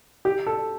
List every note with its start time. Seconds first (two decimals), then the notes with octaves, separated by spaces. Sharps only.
0.25 G4
0.46 A4